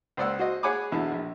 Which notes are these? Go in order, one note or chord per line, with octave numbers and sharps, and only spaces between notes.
C#2 C5 D5 F#5 E6
F#4 C5 D#5
G#4 C#5 F#5 G#5 B5 D6
E2 B2 D3 E4
A#1